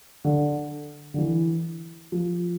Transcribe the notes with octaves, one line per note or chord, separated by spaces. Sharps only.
D3
D3
E3
F3